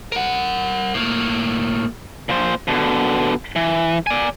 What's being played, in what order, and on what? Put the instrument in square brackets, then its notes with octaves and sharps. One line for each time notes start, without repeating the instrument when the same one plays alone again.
[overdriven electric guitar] A#4 F#5
A2 A#3
[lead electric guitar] A#2 C5
B2 D3
E3
D5 G#5